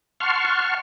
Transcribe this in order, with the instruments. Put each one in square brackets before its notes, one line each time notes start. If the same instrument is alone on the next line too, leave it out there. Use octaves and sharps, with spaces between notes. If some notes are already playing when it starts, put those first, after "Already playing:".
[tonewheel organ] F#5 A5 C6 C#6 F6